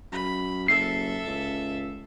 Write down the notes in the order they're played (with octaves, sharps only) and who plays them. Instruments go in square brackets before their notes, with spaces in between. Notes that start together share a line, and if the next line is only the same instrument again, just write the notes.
[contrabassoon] F#2 [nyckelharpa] B5
[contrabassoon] F#1 [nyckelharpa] A4 E5 [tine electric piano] C7
[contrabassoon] C#2